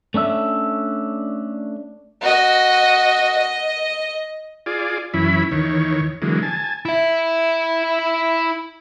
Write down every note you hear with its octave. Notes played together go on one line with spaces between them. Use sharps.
A3 C#4 D4 E5
F#4 D#5
D#5
F4 G#4 D5
F#2 E3 C#4 E4 B5
D#2 D#3 E3 C#5
D3 E3 F#3 G#3 A#3
G#5 A5
E4 E5